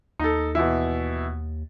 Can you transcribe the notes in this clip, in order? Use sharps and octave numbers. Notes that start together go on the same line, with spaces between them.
D#2 D#4 A4
B2 E3 E4